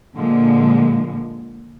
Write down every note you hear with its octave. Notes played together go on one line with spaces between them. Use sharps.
A#2 D3 F3 G#3 A#3